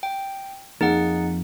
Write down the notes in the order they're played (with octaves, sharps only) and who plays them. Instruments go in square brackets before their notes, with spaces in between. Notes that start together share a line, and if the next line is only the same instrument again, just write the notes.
[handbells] G5
[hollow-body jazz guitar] F2 A#3 [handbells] D#4 G#4 F#5